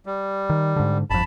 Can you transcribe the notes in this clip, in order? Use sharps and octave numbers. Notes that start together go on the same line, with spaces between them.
G3
D#3
G#2 D3
G1 F2 A5 B5